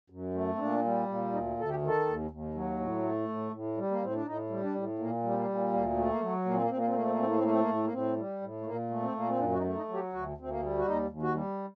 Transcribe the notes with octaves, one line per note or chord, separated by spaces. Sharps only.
F#2
A3
C4
A#2 D4
G3
A#2
D2 D#4
D2 A4
G4
D#3
A4
D#2
D#2
F#3
A2
A3
A2
A2
G3
A#3
A2 C4
D4
A2 D#4
G3
D4
A2
A#2 A#3
G3
C4
A#3
A#2
D2 A#3
A3
A#3
F#3
A#2 A#3
C4
A#3
A#2 C4
A#3
C4
A3 A#3
C4
A#3
A2 C4
A#3
C4
A3 A#3
C4
A#3
A2
A#3
A2 C4
G3
A2
A3
A#2 A#3
A3
C4
A#2 A#3
C4
F#2 D4
F#4
D#4
A3
D#4
F#3
G4
D2 F#4
D2 C4
A#3
G3
F#4
D#2 D#4
D#2
F#4
G3